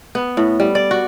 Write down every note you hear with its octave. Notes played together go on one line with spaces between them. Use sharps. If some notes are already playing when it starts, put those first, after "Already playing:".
B3
A2
G3
D5
F#4